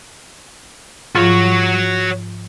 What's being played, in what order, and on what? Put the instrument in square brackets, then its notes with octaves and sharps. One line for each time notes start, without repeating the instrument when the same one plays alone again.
[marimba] G#2 F3 F4 [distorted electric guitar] F#4 C#5